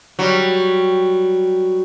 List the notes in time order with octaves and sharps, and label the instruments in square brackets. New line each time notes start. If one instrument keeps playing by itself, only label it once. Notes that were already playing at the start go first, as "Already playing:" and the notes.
[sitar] F#3 G3